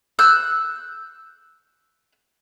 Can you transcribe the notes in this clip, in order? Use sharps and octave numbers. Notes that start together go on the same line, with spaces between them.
E6 F#6 G6